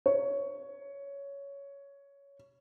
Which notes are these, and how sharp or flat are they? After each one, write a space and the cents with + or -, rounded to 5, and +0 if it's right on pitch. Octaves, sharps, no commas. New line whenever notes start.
C#5 +10